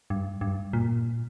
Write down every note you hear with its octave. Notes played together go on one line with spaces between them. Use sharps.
G2
G2
A#2